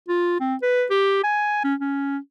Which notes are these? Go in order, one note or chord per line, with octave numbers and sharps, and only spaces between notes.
F4
C4
B4
G4
G#5
C#4
C#4